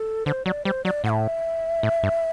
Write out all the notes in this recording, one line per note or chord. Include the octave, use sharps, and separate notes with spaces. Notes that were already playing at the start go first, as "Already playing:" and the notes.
Already playing: A4
D3 C5
F#3 D5
G3 C5
F#3 D5
A2 F#5
E5
A2
G2